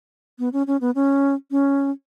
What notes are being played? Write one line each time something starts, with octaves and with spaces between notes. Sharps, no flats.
B3
C#4
C#4
B3
C#4
C#4